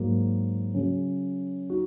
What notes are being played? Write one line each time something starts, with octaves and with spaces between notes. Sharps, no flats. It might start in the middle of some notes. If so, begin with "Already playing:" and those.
Already playing: G#2 F#3 A#3
C#3 F#3 C#4
D#4 F#4